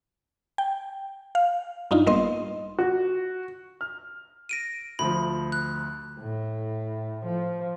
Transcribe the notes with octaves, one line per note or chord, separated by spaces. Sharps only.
G5
F5
G2 D4 D#4 F4
A1 G3 A#3 B3 D#5 C6
F#4
F6
A#6 D7 D#7
D2 F3 B5
F#6
A2
F3